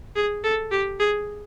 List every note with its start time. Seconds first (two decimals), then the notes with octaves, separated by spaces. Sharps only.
0.16 G#4
0.44 A4
0.71 G4
1.00 G#4